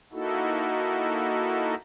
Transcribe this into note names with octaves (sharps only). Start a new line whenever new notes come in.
A#3 D#4 E4 F#4 A4